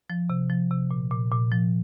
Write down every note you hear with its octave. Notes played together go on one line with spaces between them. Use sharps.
F3
C3
F3
C3
A#2
A#2
A#2
F3